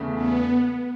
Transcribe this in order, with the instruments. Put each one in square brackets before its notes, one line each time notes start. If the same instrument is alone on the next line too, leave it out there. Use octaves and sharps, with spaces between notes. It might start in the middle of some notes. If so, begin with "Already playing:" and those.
Already playing: [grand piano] E2 C#3 A3
[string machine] B3